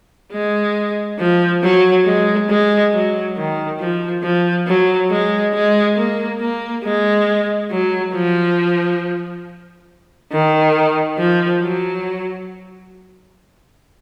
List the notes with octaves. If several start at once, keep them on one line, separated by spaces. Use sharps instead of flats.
G#3
F3
F#3
G#3
G#3
F#3
D#3
F3
F3
F#3
G#3
G#3
A#3
A#3
G#3
F#3
F3
D#3
F3
F#3